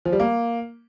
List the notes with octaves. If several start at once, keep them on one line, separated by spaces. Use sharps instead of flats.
F3
G3
A#3